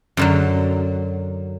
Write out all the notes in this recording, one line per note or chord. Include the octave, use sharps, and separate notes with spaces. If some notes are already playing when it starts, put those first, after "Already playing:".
F#2 D3 F#3